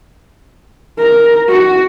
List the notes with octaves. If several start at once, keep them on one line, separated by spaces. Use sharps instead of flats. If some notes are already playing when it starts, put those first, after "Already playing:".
A#4
F#4